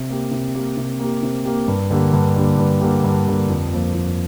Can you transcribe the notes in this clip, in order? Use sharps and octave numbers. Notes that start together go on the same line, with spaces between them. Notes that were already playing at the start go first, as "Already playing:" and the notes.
Already playing: C3
A#3 G4
C3
A#3 G4
C3
A#3 G4
C3
A#3 G4
G2
D3 A#3 G4
G2
D3 A#3 G4
G2
D3 A#3 G4
G2
D3 A#3 G4
F2
F3 A#3
F2